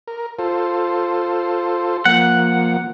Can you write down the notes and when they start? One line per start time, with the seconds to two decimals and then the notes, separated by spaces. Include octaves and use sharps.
0.08 A#4
0.39 F4 A4 C5
2.05 F3 A#3 F#5